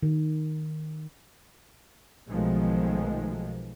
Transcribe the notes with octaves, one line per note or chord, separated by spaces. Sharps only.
D#3
B1 B2 D#3 F3 G#3 A3